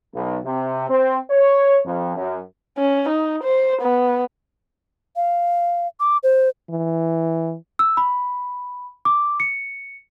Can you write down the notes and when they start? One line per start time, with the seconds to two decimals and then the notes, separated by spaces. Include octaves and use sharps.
0.14 B1
0.44 C3
0.89 C4
1.30 C#5
1.85 F2
2.16 F#2
2.78 C#4
3.09 D#4
3.44 C5
3.82 B3
5.16 F5
6.00 D6
6.23 C5
6.70 E3
7.79 E6
7.97 B5
9.05 D6
9.40 C#7